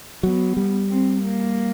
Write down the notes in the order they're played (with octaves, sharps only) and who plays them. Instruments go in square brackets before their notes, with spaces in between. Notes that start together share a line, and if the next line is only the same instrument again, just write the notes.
[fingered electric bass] F#3 [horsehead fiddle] B3
[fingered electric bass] G3
[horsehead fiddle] C4
A#3